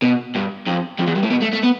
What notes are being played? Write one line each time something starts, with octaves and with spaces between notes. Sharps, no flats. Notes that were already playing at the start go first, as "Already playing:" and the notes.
B2
G2
F2
F2
E2
G2
A2
B2
A3
A3
B3